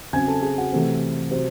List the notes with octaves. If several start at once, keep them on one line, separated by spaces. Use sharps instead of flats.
C#3 F#3 C4 G#5 G#6
A4 A5
G#4 G#5
F#4 F#5
C3 E3 A3 C4
C3 F#3 C5